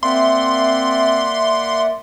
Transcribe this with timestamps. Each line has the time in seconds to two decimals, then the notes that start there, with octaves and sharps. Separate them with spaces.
0.03 A#3 C4 D5 E5 F#5 C6